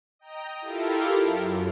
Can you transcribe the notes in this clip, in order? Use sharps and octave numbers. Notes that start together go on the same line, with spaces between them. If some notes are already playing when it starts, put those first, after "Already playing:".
D#5 G5 A#5
E4 F4 G4 A4 A#4
F#2